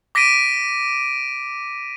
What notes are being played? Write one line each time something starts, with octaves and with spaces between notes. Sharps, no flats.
D6 A#6 B6 D7 D#7